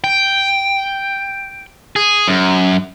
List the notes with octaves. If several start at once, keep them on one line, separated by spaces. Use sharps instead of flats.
G5
G#4
F#2